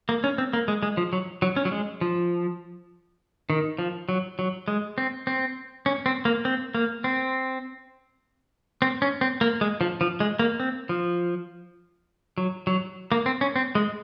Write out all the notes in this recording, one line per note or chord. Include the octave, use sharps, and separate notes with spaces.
A#3
C#4
C4
A#3
G#3
G#3
F3
F#3
F#3
C#4
F#3
G#3
F3
D#3
F3
F#3
F#3
G#3
C4
C4
C#4
C4
A#3
C4
A#3
C4
C4
C#4
C4
A#3
G#3
F3
F3
G#3
A#3
C4
F3
F#3
F#3
A#3
C4
C#4
C4
G#3